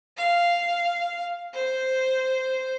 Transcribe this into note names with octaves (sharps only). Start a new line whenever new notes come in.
F5
C5